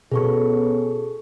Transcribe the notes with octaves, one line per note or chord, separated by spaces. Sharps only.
B2 B3 C#4 G#4 A4 C#6